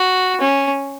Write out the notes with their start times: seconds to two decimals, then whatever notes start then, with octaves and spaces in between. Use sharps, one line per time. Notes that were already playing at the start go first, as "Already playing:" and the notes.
Already playing: F#4
0.41 C#4